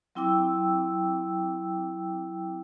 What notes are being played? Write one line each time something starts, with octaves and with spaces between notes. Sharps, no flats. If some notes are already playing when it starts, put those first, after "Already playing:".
F#3 C4 E4 G5 D6 E6